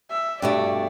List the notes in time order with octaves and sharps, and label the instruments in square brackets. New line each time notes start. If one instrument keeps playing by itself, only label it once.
[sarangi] E5
[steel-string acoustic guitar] G2 B2 A3 [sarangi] D5